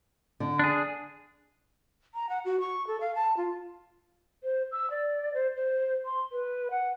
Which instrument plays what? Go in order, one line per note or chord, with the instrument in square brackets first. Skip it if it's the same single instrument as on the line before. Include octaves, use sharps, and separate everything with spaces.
[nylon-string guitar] D3
[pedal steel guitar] D4 G#4
[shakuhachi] A#5
F#5
F#4
C#6
A4
F5
A5
F4
[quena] C5
E6
D5
C5
C5
C6
B4
F#5